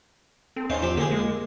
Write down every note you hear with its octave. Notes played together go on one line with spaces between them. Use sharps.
C4 A4
E2 C#4 D#4 C5 F5
F3 C4 G4
D3 A#3 G4 G#4
G#3